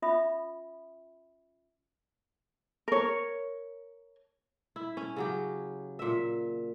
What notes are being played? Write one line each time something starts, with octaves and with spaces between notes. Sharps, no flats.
C#4 F4 E5 B5 D#6
A#4 C#5
E4
C#4
C#3 F#3 G4
A#2 E5